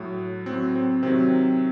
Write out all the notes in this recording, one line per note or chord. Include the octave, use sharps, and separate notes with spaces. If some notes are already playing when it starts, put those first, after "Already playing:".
Already playing: A2 F#3
A2 F#3 C4
C4
C3 D#3 F#3 C4